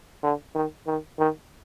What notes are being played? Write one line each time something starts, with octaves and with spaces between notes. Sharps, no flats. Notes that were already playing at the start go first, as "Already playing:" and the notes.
D3
D#3
D#3
D#3